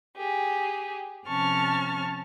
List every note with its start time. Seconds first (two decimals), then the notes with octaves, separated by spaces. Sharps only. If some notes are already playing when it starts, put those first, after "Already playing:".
0.17 G4 G#4
1.27 C3 F3 C#4 A5 C#6 F6